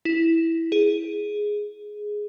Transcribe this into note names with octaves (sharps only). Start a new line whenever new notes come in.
E4
G#4